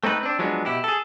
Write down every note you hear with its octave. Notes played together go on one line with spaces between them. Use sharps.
A3 C4 D#4 B4
C4 D4
F3 F#3 G#3 B3 C#4 D4
B2 E4 G4
G#4 A4